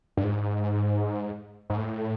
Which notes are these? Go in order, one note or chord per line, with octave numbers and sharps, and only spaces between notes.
G2
G#2
G#2
A2